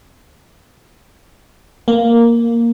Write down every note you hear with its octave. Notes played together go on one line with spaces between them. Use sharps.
A#3